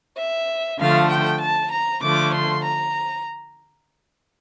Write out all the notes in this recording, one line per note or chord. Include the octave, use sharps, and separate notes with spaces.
E5
D3 F3 A3 F5
G5
A5
A#5
D3 F3 A3 D6
C6
A#5